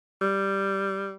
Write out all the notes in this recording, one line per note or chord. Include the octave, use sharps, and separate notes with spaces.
G3